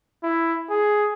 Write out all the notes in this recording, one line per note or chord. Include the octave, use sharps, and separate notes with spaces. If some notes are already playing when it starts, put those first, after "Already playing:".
E4
G#4